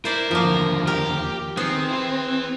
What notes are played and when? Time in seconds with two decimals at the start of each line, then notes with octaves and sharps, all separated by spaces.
0.05 E4 A#4 C5 D5
0.31 F#2 F3 A#3 F4
0.45 D#2 D3
0.87 G4 A#4
1.57 D#3 B3 C4 G#4
1.90 E4 B4